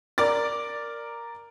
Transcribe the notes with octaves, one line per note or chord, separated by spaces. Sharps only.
A#4 D5 D6 A6